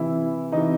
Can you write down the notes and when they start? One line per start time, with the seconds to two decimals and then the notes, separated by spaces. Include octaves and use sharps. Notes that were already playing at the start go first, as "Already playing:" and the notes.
Already playing: C3 E3 E4
0.52 C3 E3 D#4